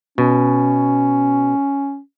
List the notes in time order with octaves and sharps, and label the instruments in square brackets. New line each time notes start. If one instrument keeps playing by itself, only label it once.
[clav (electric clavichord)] B2 [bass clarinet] C#4